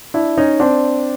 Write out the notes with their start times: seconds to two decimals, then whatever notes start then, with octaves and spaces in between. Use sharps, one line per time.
0.14 D4 E4
0.37 C#4 D#4
0.60 C4 D4